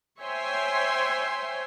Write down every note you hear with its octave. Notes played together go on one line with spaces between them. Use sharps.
C5 C#5 E5 G5 G#5 C6